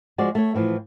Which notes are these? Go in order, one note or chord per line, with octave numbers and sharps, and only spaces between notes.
F3 G#3 F#4 D5
A3 A4 C#5
A2 E3 F3